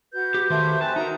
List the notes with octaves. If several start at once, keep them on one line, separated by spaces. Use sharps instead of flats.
F#4 B4 G6
G4
D#3 A3 G4 A#4 C5 E5
C4 B4 G#5 A5
D#4 F#4 A#4 A#5